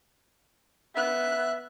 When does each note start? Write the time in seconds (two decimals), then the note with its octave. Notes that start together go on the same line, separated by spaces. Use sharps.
0.95 B3 E5 F#6